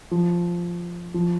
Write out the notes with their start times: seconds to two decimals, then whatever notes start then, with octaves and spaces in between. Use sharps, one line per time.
0.11 F3
1.14 F3